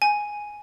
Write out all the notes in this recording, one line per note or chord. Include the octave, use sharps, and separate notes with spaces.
G#5